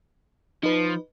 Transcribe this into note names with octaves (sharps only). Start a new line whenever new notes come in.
F3 D#4 B4